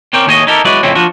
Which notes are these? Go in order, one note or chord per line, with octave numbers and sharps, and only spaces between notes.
C4 C#4 A#4 D5 G5
D#2 A2 G#4 C#5 D#5
D#4 E4 G4 A4 A#4
F#3 G#3 E4 F#4 B4 D5
F2 A2 C#3 C4 C#4 E4
F3 D4 F4 F#4